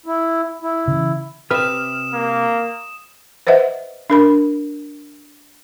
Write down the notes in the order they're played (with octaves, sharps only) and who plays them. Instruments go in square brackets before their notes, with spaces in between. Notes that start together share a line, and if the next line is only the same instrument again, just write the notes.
[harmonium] E4
E4
[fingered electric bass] C#3 E3
[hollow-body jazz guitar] C3 B4 E5 [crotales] D#6 E7 [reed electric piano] F6
[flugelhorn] A#3
[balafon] B4 C5 D#5 E5 F#5
D4 A#4 B5